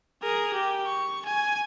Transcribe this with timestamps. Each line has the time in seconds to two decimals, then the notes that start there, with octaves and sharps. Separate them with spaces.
0.22 G#4 A#4
0.54 G4
0.86 C#6
1.25 G#5